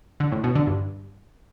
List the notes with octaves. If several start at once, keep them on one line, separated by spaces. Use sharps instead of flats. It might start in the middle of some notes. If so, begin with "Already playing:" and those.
D3
A2
B2
D3
G2